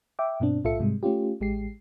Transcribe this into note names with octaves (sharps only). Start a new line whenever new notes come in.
E5 G5 D6
G2 B2 C4 D4
B1 A2 F4 A4 E5 C#7
G#2 C3 G3 G#3
A3 C#4 F4 G4
A1 G#3 G4 C7